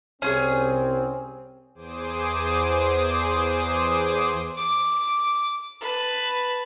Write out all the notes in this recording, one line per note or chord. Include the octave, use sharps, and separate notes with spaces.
C2 C4 C#4 F4 G#4
E2 G#4 C5 D6 D#6
D6
B4 A5